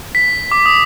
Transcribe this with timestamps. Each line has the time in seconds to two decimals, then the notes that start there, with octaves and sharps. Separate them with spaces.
0.15 B6
0.51 D6
0.66 D#6